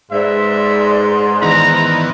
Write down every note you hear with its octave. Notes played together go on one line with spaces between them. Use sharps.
G#2 B4 D5 E5 C6
D#3 E3 B3 A#5